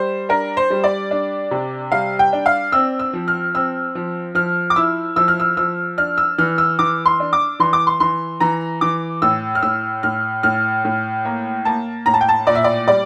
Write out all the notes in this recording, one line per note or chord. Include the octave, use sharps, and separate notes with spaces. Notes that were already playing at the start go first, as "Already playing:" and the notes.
Already playing: G3 C5
D4 A#4
C5
G3
D5
D4
C3
G3 F5
G5
D4
F5
C4 E6
E6
F3
F6
C4 E6
F3
F3 F6
D6
E4 E6
F3 E6
F6
E6
F3 E6
D4 F6
E6
E3 F6
E6
E3 D6
C6
D4
D6
E3 C6
D6
C6
E3 C6
E3 A#5
E3 D6
A2 E6
F6
A2 E6
A2 F6
A2 F6
A2
A#3
A#3 A5
A2 A#5
A5
G5
A5
A#2 D5
E5
D5
G3 D5